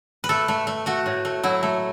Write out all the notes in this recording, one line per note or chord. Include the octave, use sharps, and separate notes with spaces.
B4
A3 A4
A3
A3
A3 F#4
A2
A3
F#3 E4
A3